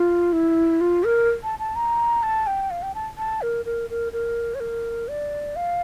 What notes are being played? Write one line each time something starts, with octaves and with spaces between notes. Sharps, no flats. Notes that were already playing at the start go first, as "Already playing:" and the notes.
Already playing: F4
E4
F4
A#4
A5
A5
A#5
A5
G5
F5
G5
A5
A5
A#4
A#4
A#4
A#4
C#5
A#4
D5
F5